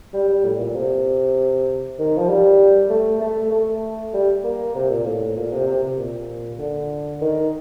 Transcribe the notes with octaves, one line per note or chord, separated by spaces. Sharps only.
G3
G3
A2
A#2
C3
D#3
F3
G3
A3
A3
A3
G3
A#3
C3
A#2
A2
A#2
C3
C3
C3
A#2
D3
D#3